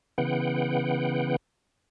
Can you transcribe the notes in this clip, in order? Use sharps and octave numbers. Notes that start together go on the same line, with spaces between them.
C#3 E3 B3 F#5 G5